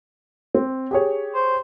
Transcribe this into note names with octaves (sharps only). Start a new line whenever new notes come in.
C4
G4 G#4 C#5
C5